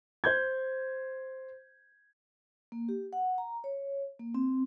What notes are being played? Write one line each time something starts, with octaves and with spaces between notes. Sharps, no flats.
C5 G6 G#6
A#3
G4
F#5
A#5
C#5
A#3
C4